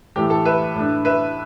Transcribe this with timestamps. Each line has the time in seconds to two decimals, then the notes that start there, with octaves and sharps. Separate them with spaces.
0.16 A2 E3 A3 G4
0.30 A4
0.45 B4 E5
0.75 A2 A3 D4
1.05 B4 E5